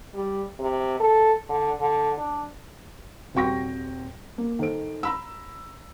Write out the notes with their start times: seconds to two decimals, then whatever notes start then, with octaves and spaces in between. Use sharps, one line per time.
0.14 G3
0.59 C3
1.00 A4
1.49 D3
1.80 D3
2.17 D4
3.34 D#1 C3 F#4 G5 C#6 A#6
4.38 A#3
4.59 D#3 A4 C5 D7
5.03 A#5 B5 E6